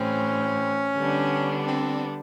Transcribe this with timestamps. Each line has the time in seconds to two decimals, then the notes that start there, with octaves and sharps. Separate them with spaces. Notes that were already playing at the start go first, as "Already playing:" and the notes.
Already playing: A2 E3 G3 C4 C#4
0.96 D3 G3 B3 D4
1.66 C4